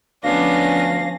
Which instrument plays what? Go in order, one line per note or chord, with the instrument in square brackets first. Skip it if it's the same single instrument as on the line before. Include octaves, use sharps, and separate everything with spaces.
[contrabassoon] D2 [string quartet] F3 C#4 A#6 [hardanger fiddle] B3 D4 [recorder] F5